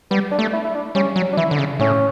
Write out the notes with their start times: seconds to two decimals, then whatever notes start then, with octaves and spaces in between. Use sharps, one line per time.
0.11 G3 B3
0.31 D4
0.39 A3
0.53 E4
0.64 E4
0.75 D4
0.95 G3 C#4
1.16 F#3
1.33 D4
1.37 E3 E4
1.51 D3
1.58 C#3
1.79 A2 C#4